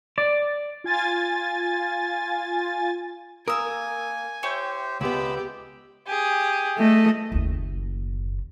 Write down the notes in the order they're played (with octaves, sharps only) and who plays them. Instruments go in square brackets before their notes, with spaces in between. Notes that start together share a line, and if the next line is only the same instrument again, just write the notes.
[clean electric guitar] D5
[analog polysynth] F4 G#5 A6
[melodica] A#3 [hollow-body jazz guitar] A#4 [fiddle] G#5 [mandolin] D#6 E6
[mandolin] E4 C#5 G5 [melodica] G4 C5
[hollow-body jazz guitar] C#2 B3 [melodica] G#3 B5 E6 [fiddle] G4
[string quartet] G4 G#4
[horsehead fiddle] A3 [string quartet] G#4 D#5 E5
[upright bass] F#1 D#2